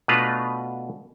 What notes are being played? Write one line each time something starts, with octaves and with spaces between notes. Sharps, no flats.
B2 A3 D4 F4 B4 A#5